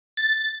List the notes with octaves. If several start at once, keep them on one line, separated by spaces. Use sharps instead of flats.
A6